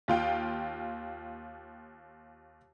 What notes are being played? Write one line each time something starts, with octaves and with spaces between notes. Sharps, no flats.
D#2 F4 G5